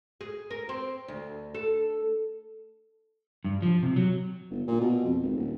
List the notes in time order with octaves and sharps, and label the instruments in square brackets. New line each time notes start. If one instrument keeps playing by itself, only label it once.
[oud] G#4
A#4
C4
D2
A4
[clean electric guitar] G2
F3
C3
F#3
[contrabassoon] G1
A#2
B2
F2
G#1
D#1